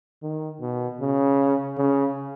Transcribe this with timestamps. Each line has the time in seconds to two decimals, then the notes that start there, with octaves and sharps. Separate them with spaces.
0.22 D#3
0.61 B2
1.01 C#3
1.78 C#3